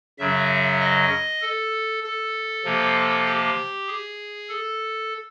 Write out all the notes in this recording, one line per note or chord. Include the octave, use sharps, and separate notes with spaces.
F#2 C#3 F#3 E5
D#5
A4
A4
C3 F3 A#3
G4
G#4
A4